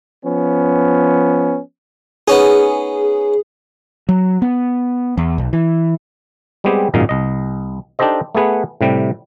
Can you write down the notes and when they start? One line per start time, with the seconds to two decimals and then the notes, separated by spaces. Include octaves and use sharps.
0.24 F3 B3 C#4
2.28 B3 C#4 D#4 G#4
4.09 F#3
4.42 B3
5.17 E2
5.38 B1
5.53 E3
6.64 G3 G#3 B3 C4 G4 G#4
6.94 G#1 F#2 A#2 D#4 G#4 F5
7.09 C2 D#5
7.99 D4 D#4 G4 A4 C5 D#5
8.35 A3 B3 G#4 B4 F#5
8.81 A2 C3 G3